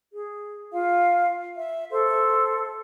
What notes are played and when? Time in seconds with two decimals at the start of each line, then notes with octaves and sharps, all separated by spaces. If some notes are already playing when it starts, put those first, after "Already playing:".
0.13 G#4
0.72 F4 F5
1.56 E5
1.91 A4 C5 C6